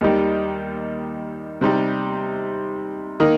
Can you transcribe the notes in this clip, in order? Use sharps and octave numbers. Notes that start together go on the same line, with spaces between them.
D#2 D#3 G3 D#4 G4
C3 G3 D#4 G4
D#3 A#3 D#4